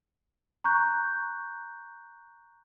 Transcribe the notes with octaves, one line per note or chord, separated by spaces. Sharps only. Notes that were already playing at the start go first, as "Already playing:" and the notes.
A#5 C#6 F#6 G6